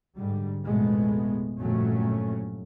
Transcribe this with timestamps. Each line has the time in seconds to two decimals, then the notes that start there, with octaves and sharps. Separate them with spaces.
0.17 G#2 D3 G3
0.65 A1 F2 B2 G#3 A3 B3
1.59 G1 F2 A#2 F#3 A3 C#4